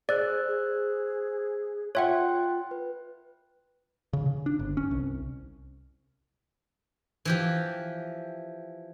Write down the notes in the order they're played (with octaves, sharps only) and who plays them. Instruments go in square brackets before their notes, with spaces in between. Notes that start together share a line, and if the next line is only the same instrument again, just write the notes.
[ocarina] G#4 [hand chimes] C5 E6 F#6 [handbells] D5
[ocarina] G#4
[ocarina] F4 [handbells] C#5 E5 F#5 [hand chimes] G5 C6 F#6
[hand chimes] B4
[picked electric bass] C#3
C#3
D4
G1
C#4
C2
[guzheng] E3 F3 G4